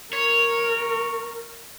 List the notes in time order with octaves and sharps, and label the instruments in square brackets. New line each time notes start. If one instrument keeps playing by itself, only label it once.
[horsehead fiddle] A#4 [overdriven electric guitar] C#5